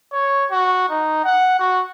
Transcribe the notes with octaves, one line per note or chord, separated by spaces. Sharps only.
C#5
F#4
D#4
F#5
F#4